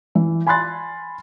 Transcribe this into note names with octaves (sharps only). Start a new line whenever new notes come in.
E3
G#5 B5 C6 F#6 A6